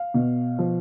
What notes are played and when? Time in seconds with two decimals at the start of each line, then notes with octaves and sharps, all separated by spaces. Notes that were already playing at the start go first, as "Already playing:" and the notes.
Already playing: F5
0.14 B2
0.59 F3